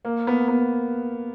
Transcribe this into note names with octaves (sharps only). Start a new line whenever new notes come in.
A#3
B3
B3